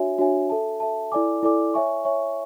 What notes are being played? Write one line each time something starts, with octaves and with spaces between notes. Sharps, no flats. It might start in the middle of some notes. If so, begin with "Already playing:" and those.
Already playing: D4 F#4 C#5 E5 G#5
D4 F#4 C#5 E5 G#5
A4 E5 A5
A4 E5 A5
E4 A4 D5 G#5 D6
E4 A4 D5 G#5 D6
C#5 E5 G#5 C#6
C#5 E5 G#5 C#6